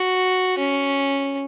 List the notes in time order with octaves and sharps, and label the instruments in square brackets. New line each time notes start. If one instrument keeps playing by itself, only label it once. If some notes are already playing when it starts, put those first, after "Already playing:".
Already playing: [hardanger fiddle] F#4
C#4